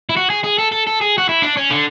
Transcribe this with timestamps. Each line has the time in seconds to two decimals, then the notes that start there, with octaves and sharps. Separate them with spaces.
0.09 E4
0.16 F#4
0.30 G#4
0.44 G#4
0.59 A4
0.72 A4
0.87 A4
1.01 G#4
1.18 F#4
1.29 E4
1.42 D4
1.57 C#4
1.71 D3